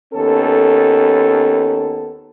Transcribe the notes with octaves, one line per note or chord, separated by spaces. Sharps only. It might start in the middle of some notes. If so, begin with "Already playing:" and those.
D#2 B3 C#4 A4